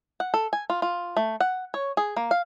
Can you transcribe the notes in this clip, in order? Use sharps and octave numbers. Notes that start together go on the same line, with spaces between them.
F#5
A4
G#5
F4
F4
A3
F#5
C#5
G#4
A#3
F5